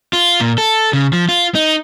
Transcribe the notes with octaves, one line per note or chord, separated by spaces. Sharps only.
F4
A#2
A4
C#3
F3
F4
D#4